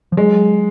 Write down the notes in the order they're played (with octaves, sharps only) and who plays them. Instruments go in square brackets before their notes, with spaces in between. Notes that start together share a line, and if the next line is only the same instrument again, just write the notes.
[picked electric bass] F3
[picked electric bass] F#3 [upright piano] G#3